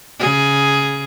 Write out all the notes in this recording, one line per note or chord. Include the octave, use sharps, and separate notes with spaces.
C#3 G#4